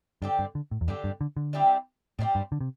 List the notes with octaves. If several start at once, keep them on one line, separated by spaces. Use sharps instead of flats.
G2 D3 C4 G4
G2
D3
A2
E2
G2 D3 C4 G4
G2
D3
D3
G3 C4 E4 G4
A2 G3 C4 E4 G4
G2
D3
C3